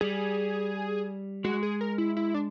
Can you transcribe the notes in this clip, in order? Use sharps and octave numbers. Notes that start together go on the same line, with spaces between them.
G3 G#4
G#3 F#4
G#4
A#4
E4
E4
D4